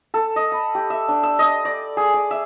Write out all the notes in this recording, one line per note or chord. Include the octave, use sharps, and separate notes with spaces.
A4
D#5
B5
G4
E5
D4
E6
D#5
D5
G#4
D5
E5